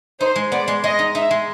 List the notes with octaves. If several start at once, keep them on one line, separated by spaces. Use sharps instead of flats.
D#4 C5
G#3
B3 D5
G#3
G#3 D#5
D#4
D#4 E5
G#3